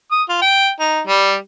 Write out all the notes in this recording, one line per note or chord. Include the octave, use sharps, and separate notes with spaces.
D#6
F4
G5
D#4
G3